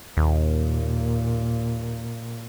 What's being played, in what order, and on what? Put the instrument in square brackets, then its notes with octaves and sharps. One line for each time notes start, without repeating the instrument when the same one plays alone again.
[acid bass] D#2 [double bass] A#2